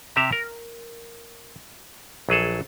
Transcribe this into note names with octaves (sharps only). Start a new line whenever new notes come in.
C3 G4 E5 A#5
A#4
A#1 F#3 G#4 A4